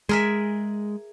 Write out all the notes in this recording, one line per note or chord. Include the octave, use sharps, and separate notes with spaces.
G#3 G#4 A#4 E5